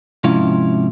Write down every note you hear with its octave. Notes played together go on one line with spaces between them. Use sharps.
G#2 C3 F3 C#4 E4 F5